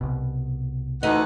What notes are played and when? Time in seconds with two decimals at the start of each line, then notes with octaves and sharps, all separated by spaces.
0.01 C2 B2
1.03 D2 E3 D#4 F#5